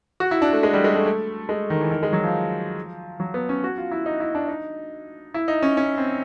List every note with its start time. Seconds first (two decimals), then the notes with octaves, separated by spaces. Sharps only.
0.20 F#4
0.31 E4
0.42 D4
0.53 A3
0.63 G#3
0.73 G3
0.84 G#3
0.95 A3
1.06 A3
1.49 G#3
1.70 D#3
1.81 E3
1.91 D#3
2.03 G#3
2.13 F#3
2.24 F3
3.20 F#3
3.34 B3
3.49 C#4
3.64 F#4
3.78 F4
3.91 E4
4.06 D#4
4.20 E4
4.35 D4
4.48 D#4
5.34 E4
5.48 D#4
5.62 C#4
5.77 C#4
5.98 C4